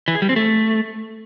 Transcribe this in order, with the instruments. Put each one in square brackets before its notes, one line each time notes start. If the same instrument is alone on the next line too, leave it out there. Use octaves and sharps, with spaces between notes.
[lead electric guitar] E3
G#4
G3
C4
A3